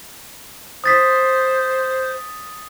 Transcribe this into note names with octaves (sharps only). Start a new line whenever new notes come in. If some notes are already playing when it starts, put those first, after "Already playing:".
C5 D#6 A6 B6